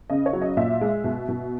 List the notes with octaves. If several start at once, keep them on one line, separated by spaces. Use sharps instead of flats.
C#3 D#5
C#5
F#3
D#5
A#2 E5
G#3
B2
B2